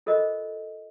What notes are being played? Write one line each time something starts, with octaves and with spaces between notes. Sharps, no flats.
F4 A4 A#4 C5 D#5